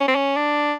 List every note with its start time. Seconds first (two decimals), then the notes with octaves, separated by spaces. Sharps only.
0.01 C#4
0.08 C4
0.16 C#4
0.36 D4